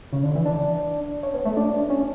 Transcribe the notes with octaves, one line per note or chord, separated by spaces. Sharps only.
C#3
D3
E3
D4
C#4
B3
A3
D4
C#4